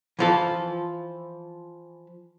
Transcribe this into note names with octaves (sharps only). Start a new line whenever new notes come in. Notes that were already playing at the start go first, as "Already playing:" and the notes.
E3 F3 A4